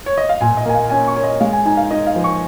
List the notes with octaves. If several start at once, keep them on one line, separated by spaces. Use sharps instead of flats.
C#5
D#5
F5
A#2 G#5
D#5
A#3 G#5
F5
C#4 G#5
C#6
C#4 C#5
D#5
G#3 F5
G#5
D#4 G#5
F5
D#4 D#5
F5
F3
C#6